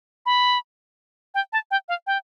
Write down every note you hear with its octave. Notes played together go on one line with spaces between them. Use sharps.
B5
G5
A5
G5
F5
G5